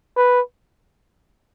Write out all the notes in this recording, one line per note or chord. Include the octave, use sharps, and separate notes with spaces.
B4